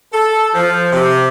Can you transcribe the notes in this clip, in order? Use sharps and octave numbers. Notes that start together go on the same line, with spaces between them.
A4
F3
C3